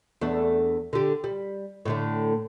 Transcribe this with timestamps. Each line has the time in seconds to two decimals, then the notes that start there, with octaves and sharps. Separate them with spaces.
0.21 E2 A3 D4
0.93 D3 G4
1.24 G3
1.85 A2 D3 A3